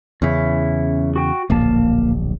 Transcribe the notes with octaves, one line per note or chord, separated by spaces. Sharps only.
E2 C#3 C#4 E4
F#4 G5
D1 A#1 A#3 F5 A5